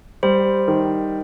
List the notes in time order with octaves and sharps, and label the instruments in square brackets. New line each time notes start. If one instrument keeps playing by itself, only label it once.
[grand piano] G3 [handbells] C5
[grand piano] D#3